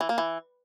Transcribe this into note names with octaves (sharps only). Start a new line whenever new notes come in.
E3
A#3
E3